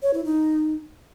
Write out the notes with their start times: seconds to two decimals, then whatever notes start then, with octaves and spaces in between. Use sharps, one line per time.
0.03 C#5
0.14 E4
0.25 D#4